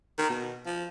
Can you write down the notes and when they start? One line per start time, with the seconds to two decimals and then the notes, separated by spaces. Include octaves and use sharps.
0.18 D#3
0.30 B2
0.66 F3